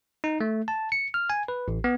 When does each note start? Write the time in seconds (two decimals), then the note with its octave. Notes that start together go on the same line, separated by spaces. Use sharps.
0.24 D#4
0.41 A3
0.68 A5
0.92 C#7
1.14 F6
1.30 G#5
1.48 B4
1.68 A1
1.84 B3